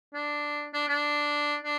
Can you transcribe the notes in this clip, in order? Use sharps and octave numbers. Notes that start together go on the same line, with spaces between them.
D4
D4
D4
D4